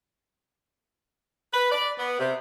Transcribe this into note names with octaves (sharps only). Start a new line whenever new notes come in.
B4
D5
B3
C3